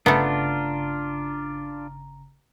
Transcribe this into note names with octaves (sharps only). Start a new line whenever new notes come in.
G1 C#3 A3 B3 D4 F4 A#5